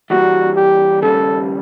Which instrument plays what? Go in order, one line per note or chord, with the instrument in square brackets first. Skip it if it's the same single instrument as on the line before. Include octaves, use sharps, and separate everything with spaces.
[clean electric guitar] E3 G3 A#3 [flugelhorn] F#4
[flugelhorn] G4
[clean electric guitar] D#2 C#3 E3 G3 A#3 [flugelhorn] A4